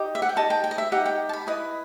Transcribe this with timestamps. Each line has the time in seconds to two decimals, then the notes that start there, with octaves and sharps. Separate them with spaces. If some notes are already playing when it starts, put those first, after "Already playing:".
Already playing: D#4 G4 D#5
0.15 E5
0.22 F#5
0.29 G5
0.36 D#4 G4 D#5 A5
0.50 G5
0.64 G5
0.71 D#5
0.78 E5
0.92 D#4 G4 D#5 F#5
1.06 G5
1.29 A5
1.33 B5
1.47 E4 B4 D#5 D#6